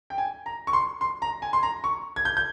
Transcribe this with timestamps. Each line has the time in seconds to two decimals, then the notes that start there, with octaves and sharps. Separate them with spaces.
0.10 G5
0.18 G#5
0.46 A#5
0.67 C#6
0.73 C6
1.01 C6
1.22 A#5
1.42 G#5
1.53 C6
1.63 A#5
1.84 C#6
2.16 G#6
2.25 G6
2.37 G6